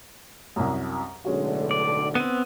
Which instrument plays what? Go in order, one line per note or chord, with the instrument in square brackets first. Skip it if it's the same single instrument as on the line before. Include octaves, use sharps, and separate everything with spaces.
[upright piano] C2 F#2
[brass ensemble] B1 A2 D3 [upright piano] G#3 C#4 F#4
[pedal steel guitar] D5
[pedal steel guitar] B3 C4 [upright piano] D#7